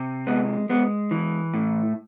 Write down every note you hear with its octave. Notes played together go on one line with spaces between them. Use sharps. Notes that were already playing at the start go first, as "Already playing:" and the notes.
Already playing: C3
G#3 B3
G#3 B3
E3
A2